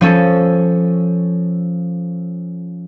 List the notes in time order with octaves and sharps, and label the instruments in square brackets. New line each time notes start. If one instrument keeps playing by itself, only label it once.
[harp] F3 C#4 A4